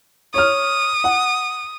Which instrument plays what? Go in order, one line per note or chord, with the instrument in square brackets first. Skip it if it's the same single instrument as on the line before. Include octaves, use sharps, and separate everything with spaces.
[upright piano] C#5 F6 [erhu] D#6
[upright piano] F#5